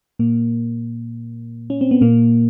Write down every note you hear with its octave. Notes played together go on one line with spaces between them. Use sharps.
A#2 A#3
C#4
C4
B3
A#2 A#3